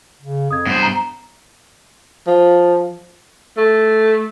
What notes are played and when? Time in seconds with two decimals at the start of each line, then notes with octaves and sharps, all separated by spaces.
0.22 C#3
0.51 F2 D#6 G#6
0.66 G2 B3 C5
0.83 A#5
2.27 F3
3.58 A3